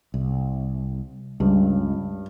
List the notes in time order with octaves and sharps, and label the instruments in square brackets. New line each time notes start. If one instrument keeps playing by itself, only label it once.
[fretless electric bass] C2
[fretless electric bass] C#2 [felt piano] G2